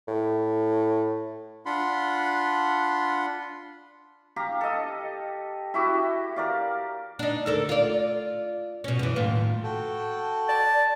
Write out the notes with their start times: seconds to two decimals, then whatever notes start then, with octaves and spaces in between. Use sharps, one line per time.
0.08 A2
1.66 D4 F4 F#5 B5 C6
4.36 G4 F5 A#5
4.61 A4 D#5
5.74 E4 F#4 G4
6.36 A#4 D5 F5
7.19 D4 D#4
7.46 D2 A4 A#4
7.69 F4 D5
8.84 B2 C#4
8.99 F#2 E3
9.16 D#2 A2 F4
9.63 F#4 A4 G5
10.49 D5 A5